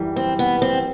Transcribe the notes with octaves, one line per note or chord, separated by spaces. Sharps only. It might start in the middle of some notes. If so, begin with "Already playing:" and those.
Already playing: F#2 E3 G3
C4
B3
C4